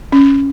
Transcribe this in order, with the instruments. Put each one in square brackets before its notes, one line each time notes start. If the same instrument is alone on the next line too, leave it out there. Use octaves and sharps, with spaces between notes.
[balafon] C#4